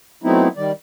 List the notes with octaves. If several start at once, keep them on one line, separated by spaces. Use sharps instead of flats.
F#3 A3 B3 C4 D#4 E4
D#3 G3 D5